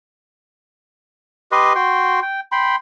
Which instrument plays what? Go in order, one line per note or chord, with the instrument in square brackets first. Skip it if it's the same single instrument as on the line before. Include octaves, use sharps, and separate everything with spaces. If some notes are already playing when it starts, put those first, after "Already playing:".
[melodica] G4 B4 D#5 C6
F#4 G5 C6
G5
G5 B5 C6